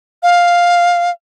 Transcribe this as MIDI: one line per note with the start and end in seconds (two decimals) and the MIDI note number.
0.23 1.10 77